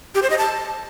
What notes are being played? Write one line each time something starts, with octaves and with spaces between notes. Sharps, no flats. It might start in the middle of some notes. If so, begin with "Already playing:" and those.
G4
C5
D#5
A5